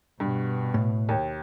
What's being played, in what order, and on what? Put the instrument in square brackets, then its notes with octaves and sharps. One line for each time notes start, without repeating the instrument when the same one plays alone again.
[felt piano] G2 [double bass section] B2
[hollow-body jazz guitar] A2
[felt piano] D#2